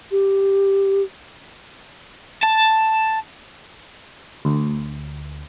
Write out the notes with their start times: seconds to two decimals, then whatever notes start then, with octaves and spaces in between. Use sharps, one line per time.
0.11 G4
2.43 A5
4.45 D2